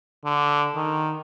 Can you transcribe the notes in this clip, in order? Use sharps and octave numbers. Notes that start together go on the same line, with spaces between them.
D3
D#3